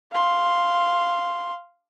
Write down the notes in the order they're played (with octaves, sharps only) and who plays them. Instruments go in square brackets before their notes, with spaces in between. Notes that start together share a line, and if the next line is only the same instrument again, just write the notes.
[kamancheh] F5 C6